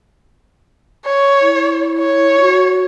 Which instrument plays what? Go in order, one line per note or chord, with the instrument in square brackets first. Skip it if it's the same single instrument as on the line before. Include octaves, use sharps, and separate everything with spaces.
[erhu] C#5
[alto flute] E4
[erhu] C#5
[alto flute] F#4